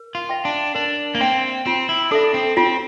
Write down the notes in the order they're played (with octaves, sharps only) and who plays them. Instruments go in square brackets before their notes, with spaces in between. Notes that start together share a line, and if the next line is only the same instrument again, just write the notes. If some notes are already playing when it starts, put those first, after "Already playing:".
Already playing: [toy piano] A#4
[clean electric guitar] F4
[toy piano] E5 G5 C6
[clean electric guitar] D4
[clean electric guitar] D4 [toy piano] A#4
[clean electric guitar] A#3
[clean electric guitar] C4 [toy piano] E5 G5 C6
[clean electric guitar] C4 [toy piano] F4
[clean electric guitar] E4
[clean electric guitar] D4 [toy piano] A4 E5
[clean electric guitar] C4
[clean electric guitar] C4 [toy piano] F4